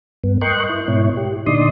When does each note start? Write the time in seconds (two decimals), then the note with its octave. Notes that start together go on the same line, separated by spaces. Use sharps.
0.24 G2 B3
0.41 A#4 D#5 G5 C6 C#6 F#6
0.69 E4
0.88 G#2 B2 E4 C#5
1.17 G4
1.46 A#2 D3 D#4 D5 C6 D#6